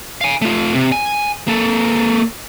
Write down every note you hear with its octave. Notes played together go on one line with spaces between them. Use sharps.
F5 G#5
A3 F4
C3
G#5
A#3 A4